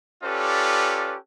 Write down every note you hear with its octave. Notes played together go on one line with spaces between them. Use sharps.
C#4 F4 G4 A4 B4 D5